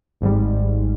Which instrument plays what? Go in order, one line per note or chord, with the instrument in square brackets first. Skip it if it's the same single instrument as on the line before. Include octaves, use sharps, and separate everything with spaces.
[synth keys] G#1 G#2 G3